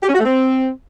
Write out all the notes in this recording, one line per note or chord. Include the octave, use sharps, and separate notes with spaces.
G4
C#4
F#4
A3
C4